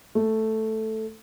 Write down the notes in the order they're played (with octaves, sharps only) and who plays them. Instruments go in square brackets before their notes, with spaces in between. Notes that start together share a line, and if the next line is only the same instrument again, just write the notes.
[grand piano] A3